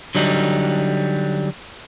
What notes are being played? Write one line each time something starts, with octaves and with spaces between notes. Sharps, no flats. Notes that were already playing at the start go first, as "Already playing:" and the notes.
D3 F#3 G3 D#4